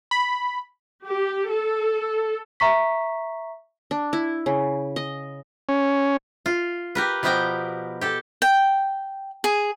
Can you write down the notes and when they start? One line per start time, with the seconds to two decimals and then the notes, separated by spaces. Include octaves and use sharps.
0.11 B5
1.04 G4
1.49 A4
2.60 E5 A#5 C#6 B6
3.91 D4
4.13 E4
4.46 C#3
4.96 D#5
5.69 C#4
6.46 F4
6.95 G4 A#4 B4
7.23 B2 F3 B3 G4 A#4 G5
8.01 G4 A4
8.42 G5
9.44 G#4